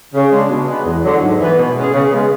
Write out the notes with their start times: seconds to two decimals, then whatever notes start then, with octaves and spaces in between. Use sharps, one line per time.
0.14 C#3
0.32 G#3 D4
0.49 B2
0.68 G#3 B3
0.85 E2
1.03 D3 F#3
1.21 G#2
1.40 E3 B3
1.57 B2
1.75 G#3 C#4 G#4
1.93 C#3
2.10 G#3 B3